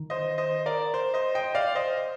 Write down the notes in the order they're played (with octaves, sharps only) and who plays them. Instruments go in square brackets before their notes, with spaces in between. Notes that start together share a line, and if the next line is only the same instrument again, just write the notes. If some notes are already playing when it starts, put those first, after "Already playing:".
Already playing: [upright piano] D#3
[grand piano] C5 D#5
C5 D#5
A#4 D5
C5
C5 D#5
D#5 G5
D5 F5
C5 D#5